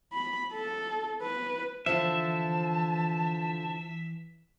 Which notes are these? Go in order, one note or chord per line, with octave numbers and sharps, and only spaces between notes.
B5
A4
B4
D3 E3 F3 E5 A5